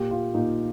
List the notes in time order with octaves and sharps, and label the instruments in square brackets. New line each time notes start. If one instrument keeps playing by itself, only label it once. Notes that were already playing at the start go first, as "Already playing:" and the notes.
Already playing: [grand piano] A#2 G4
F4
A#2 D#4